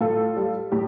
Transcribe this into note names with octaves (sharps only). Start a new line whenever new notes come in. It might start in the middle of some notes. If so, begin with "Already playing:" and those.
A2 F4 A4
G3
A2 G4